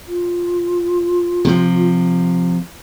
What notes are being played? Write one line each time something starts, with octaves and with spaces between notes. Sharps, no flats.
F4
C3 F3